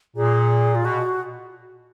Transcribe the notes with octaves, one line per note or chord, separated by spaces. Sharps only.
A#2 G#4
F4
B2 F#4